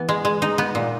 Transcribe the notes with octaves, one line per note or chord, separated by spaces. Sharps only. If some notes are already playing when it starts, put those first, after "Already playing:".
Already playing: E3 B3
G#3
G#3
D#4
B3
A#2